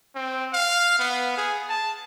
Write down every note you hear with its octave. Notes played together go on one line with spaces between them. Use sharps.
C4
F5
B3
G#4
A5